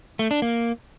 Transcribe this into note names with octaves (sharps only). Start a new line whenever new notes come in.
A3
D4
A#3